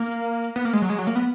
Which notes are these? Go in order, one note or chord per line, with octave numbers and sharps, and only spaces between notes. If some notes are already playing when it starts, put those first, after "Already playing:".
Already playing: A#3
B3
A#3
G#3
F#3
G#3
F#3
A#3
B3